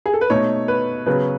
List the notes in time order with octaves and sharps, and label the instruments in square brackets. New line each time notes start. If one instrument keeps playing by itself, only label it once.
[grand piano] G#4
A4
B4
[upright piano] B2 A3 D#4 [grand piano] C#5
[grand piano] B4
[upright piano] C#3 F#3 B3 F#4 [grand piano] B4